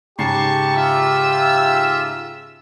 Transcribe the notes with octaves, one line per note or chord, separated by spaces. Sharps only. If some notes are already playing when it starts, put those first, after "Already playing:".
G#2 C#3 G4 A5 C#6 C7
F4 E5 E6